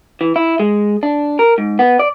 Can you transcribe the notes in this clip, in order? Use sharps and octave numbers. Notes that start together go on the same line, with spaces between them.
E3
E4
G#3
D4
A#4
G#2
B3
D5